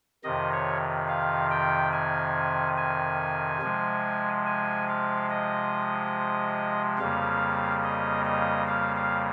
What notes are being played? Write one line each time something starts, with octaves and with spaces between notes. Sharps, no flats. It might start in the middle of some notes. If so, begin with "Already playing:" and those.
F2 C3 D#3 D#5
C#5
F5
G5
G#5
G#5
C3 F3 G#3
G#5
F5
D#5
F2 C#3 G3 A#3 F5
D#5
D#5
F5
F5